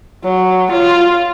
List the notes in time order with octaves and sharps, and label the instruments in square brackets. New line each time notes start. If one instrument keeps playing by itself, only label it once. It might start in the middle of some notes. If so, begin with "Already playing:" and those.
[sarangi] F#3
F4